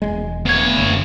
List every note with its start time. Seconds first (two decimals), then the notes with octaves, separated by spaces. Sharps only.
0.02 E1 G#3
0.45 D2 B3 C#5 G#6
0.77 F#1 D3